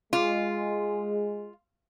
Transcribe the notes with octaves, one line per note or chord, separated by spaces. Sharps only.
G#3 F4